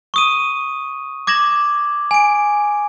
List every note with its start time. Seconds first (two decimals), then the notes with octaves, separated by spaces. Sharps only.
0.14 C#6 D#6 D#7
1.27 D6 G#6 A#6 E7 F#7
2.11 G#5 D7